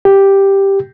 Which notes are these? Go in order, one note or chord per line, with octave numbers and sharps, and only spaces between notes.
G4